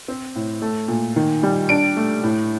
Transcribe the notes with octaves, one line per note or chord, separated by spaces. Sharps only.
C4
A2
A3
A#2
D#3
G3
D4 D7
A3
A2